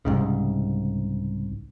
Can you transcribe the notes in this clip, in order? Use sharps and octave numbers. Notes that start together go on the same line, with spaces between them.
C2 G#2 C#3